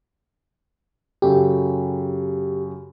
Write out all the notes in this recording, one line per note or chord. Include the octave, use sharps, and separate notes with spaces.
F#2 C#3 G4 A4